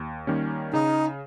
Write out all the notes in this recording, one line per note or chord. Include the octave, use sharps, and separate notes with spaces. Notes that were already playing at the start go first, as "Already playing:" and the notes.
Already playing: D#2
D#3 G3 A#3 C#4
C#3 D#4